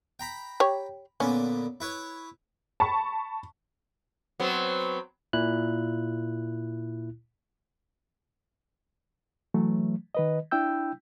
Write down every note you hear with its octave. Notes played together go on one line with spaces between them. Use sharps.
G5 A#5 B5
G4 C#5
A#2 D3 B3 C#4
E4 B4 C#5
A5 B5 C#6
F#3 B3 C4
A#2 E4 F#6
E3 F#3 A3
D#3 B4 D#5
D4 E4 G5 E6 G6